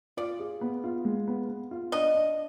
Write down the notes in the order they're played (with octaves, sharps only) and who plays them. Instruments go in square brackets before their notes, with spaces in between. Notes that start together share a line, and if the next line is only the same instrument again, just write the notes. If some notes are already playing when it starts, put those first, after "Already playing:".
[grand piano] F4 [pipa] D5
[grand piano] G#4
B3
F4
G#3
B3
B3
F4
[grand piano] D4 [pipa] D#5
[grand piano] D4